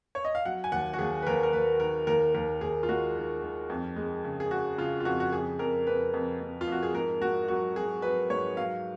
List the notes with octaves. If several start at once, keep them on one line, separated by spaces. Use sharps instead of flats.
C#5
D#5
F5
F#3 F#5
G#5
D#2 F#5
F#4
D#2 G#4
B4
D#2 A#4
A#4
D#2 B4
D#3 A#4
D#2 A#4
D#2 A#4
D#2 G#4
F4
G#3 F#4
D#3
D#3
F2
G#3
C#3
G#4
C#3 F#4
C#3 F4
F4
F2 F#4
F#4
F2 G#4
F2 A#4
F2 B4
F2
F2
F4
F2 F#4
G#4
G#2 A#4
G#2 F#4
F#3 F#4
F#3 G#4
F#3 B4
G#2 C#5
F#3 F5